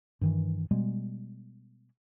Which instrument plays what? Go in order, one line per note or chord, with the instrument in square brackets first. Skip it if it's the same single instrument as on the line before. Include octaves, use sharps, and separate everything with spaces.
[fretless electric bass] G2 D#3 E3
B2 G3 G#3 B3